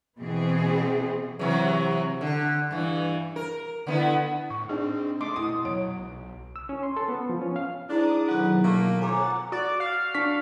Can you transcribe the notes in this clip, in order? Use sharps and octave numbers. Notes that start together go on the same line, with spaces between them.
B2 E3 C4 G#4
C3 E3 F#3
D3
G2 E3
A#4
D3 B3 E4
A2 C#6
C4 D4 D#4 G#4
A3 D#5 C6 D6
B2 E4 D#6
F#3 C#5 D7
B1
E6
C#4
C6
A4
B3
F3
C#4
F5
G#2 D4 E4 G#4 A#5 D6 D#6
D2 B2 D#3 F#3 B4 F#5
A3 A#3
F2 C#5 F#5 G#5 A#5 D6 A6
F#4 D5
F5
D4 C#6 B6